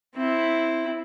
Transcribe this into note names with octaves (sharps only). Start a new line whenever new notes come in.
C4 E4